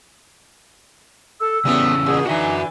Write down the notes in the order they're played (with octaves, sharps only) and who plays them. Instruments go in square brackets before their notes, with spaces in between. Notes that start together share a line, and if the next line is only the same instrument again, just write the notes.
[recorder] A4 [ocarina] E6
[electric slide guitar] C#3 E3 C#4 [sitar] G3 A3 [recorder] B3
[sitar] A#2 [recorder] G#4
[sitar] D3 E3 [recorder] D#4 [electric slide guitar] F#4 G5 G#5 [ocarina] E5